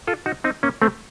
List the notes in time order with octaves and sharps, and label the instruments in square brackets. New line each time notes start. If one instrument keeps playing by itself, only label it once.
[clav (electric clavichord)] F4 A4
D#4 F#4
C4 D#4
A#3 C#4
A3 C4